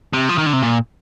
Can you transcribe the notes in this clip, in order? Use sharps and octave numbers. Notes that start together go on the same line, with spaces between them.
C3
F3
D#3
D3
C3
A#2